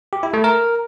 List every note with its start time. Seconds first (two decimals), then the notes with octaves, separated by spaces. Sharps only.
0.13 G4
0.23 E4
0.34 A3
0.44 A#4